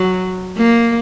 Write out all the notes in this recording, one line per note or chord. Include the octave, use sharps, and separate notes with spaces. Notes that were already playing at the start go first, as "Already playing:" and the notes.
Already playing: F#3
A#3